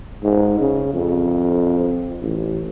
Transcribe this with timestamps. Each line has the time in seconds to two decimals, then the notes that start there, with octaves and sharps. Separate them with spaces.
0.23 G#2
0.59 C#3
0.93 F2
2.22 A1